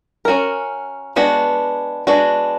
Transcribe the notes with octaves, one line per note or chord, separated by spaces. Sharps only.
C#4 F#4 A#4
G#3 B3 D4 F#4
G#3 B3 D4 F#4